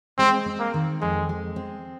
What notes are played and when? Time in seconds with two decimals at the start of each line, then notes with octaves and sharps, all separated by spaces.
0.18 G#3 C4
0.46 C4
0.60 A#3
0.74 D#3
1.01 F2 G#3
1.29 G#3
1.56 C4